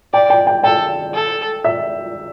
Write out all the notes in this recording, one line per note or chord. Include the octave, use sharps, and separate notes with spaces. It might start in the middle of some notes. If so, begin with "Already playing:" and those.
D5 G5
G5
G5
A4 G5
A4
E5